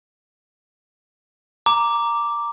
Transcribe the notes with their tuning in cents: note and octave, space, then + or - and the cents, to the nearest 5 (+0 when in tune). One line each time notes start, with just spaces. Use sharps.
A#5 +0 D6 +0